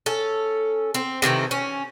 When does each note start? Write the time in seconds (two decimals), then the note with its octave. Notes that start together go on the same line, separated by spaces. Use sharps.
0.06 C#4 A4
0.94 C4
1.22 C3 D#3 E3 A3
1.51 C#4